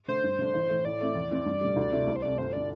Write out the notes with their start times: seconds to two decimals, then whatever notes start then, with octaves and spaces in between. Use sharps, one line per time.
0.08 D3 A3 C5
0.24 G2
0.39 D3 A3 D4
0.54 A1
0.69 A2 E3 A3
0.85 A2 D5
1.01 A3 C4 E4
1.15 E2
1.31 E3 C4 E4
1.46 G2
1.61 D3 G3
1.76 D2
1.92 C3 A3 C4 E4
2.07 C2
2.16 C5
2.22 C3 A3 C4 D5
2.38 G1 C5
2.53 D3 D5